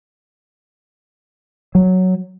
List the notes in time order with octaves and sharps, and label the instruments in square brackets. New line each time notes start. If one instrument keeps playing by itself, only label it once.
[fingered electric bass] F#3